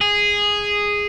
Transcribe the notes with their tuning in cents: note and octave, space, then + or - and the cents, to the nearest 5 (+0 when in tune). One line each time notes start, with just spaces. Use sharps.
G#4 -10